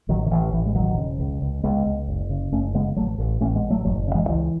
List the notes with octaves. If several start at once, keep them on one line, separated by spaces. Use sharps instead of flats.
A1 D#3 F#3
D#3
A1 E3
A1 E3
G#3
E1 D#3 F#3
C#3
C#2
C#2
C#2 G#3 B3
C#2
F#1
C#3
F#1 A3 C#4
C#3 G#3 B3
A1 F#3 A3
A1
A1 A3 C#4
G#3 B3
A1
F#3 A3
F#1 F#3 A3
C#3
E3 G#3
C#2 E3